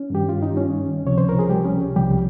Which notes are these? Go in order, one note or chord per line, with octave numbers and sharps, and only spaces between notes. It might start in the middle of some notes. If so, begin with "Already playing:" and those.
Already playing: C#4
G2 D#3 G3 G4
F4
D#4
C#4
C#2 C3 F3 C#5
C5
A#4
G#4
G3 G4
C#4
C2 C3 F3 G3 G4